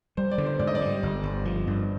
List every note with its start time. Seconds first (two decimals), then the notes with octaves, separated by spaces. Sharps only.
0.17 G3 C5
0.32 D5
0.38 D3
0.46 C5
0.59 G#2 D5
0.67 D#5
0.75 D5
0.81 G3
1.03 G1
1.23 G1
1.45 F3
1.67 G2